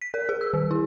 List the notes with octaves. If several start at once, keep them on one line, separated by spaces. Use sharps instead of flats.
B6
A#4
G#4
E6
D#3
E4